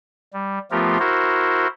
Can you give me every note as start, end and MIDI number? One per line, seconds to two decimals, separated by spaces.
0.33 0.59 55
0.71 0.98 53
0.71 0.98 57
0.71 0.98 59
0.71 0.98 65
0.71 0.98 67
0.71 0.98 70
1.00 1.67 64
1.00 1.67 66
1.00 1.67 70
1.00 1.67 72